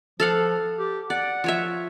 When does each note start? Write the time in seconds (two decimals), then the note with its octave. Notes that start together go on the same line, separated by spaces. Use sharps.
0.20 F3 A4 F5 F#5
0.78 G4
1.10 D5 F#5
1.44 F3 C#5 E5